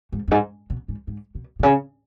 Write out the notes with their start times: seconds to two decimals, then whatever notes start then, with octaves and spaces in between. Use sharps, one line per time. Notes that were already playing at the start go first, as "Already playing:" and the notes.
0.12 G#2
0.28 F#2
0.31 G#2
0.70 B2
0.88 G#2
1.07 G#2
1.35 B2
1.59 B2
1.63 C#3